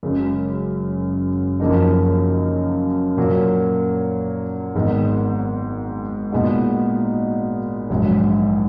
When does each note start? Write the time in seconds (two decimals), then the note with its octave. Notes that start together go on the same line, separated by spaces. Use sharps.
0.03 F#1 F#2 C#3 G#3
1.60 F#2 C#3 F3 A#3 D#4
3.17 A#2 F#3 A#3
4.75 G#1 G#2 D#3 G#3 B3
6.32 A#2 G#3 B3 D#4 F#4
7.90 A#1 G#2 F#3